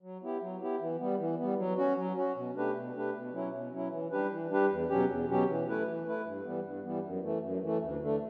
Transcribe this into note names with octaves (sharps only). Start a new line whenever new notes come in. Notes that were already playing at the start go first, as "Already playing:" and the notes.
F#3
B3 E4 G4
F#3
B3 E4 G4
E3
G3 B3
E3
G3 B3
F#3
C#4 F#4
F#3
C#4 F#4
B2
A3 D4 G4 B4
B2
A3 D4 G4 B4
B2
F#3 C#4 E4
B2
F#3 C#4 E4
E3
G3 D4 G4 B4
E3
G3 D4 G4 B4
E2
B2 F#3 C#4 G4
E2
B2 F#3 C#4 G4
E3
A3 E4 B4
E3
A3 E4 B4
G2
E3 G3 B3
G2
E3 G3 B3
F#2
E3 A3
F#2
E3 A3
D2
D3 A3